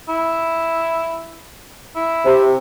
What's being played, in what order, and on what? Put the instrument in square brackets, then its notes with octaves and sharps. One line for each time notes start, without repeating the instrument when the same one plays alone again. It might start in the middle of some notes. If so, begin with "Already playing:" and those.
[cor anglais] E4
E4
[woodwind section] C3